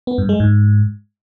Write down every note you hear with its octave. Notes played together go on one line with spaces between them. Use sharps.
B3
G2
G#3
G#2